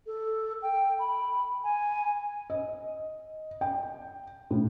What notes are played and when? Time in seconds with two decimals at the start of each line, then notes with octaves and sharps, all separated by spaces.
0.07 A4
0.62 G5
0.99 B5
1.64 G#5
2.50 D#5
3.61 G5
4.51 A2